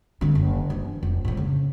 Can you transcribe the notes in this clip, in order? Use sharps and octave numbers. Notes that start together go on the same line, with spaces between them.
D3 C4
F#1
G2 E3
F1
A2 F3
C#3